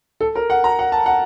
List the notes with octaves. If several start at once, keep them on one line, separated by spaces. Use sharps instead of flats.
A4
A#4
F#5
A#5
F#5
A5
F#5